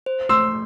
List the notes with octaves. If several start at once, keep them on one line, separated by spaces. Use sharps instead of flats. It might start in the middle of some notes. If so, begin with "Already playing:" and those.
C5
A3 C6 E6